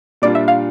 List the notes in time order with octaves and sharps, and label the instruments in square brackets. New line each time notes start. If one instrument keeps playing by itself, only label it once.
[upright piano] A#2 G3 D4 F4 [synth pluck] D5
[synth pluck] E5
F5